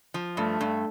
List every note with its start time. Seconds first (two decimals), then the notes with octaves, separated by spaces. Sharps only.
0.14 F3
0.37 G2 A3
0.61 G2